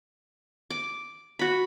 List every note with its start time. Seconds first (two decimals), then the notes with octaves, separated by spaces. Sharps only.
0.70 D6
1.39 F#4 B5